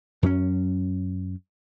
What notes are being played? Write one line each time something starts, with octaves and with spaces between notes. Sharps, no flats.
F#2 F#3 C4 C#4